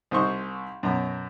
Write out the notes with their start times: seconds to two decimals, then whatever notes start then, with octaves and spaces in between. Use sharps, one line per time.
0.11 C2 D#4 C5 D#5 C#6
0.83 F#2 B2 A#5